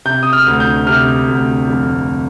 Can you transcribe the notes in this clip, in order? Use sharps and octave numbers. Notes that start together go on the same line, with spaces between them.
C3 G6
D#6
F6
D2
G6
C3 F6
D2
F1